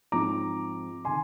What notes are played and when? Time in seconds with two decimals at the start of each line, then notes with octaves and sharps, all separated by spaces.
0.12 G#2 F3 C4 A#5 D6
1.05 C3 D#3 G#5 C6